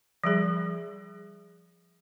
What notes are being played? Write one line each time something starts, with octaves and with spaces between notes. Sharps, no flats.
F3 G3 G#4